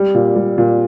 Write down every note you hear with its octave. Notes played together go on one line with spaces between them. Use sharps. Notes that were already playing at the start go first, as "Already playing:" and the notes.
Already playing: G3
A#2
G3
A#2